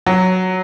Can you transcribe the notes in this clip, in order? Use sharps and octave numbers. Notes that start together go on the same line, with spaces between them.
F#3